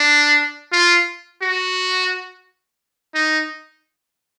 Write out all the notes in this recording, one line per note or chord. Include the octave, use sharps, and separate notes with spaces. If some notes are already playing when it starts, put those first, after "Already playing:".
Already playing: D4
F4
F#4
D#4